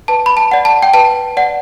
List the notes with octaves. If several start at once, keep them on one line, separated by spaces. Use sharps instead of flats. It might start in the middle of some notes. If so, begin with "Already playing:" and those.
B4 A5
B5
A5
D5 F#5
A5
G5
B4 A5
D5 F#5